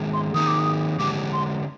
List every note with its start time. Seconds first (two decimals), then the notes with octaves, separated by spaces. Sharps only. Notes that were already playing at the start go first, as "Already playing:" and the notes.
Already playing: D#3 G#3 D4 G#4
0.13 C6
0.34 D#3 A#3 D#4 G#4 D#6
0.47 D6
0.59 D#6
0.99 D3 G#3 D4 G4 D6
1.33 C6